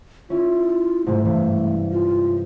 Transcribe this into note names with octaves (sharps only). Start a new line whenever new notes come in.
C#4 E4 F4
G#2 C3 G#3 A3
G2 C3 E3
F4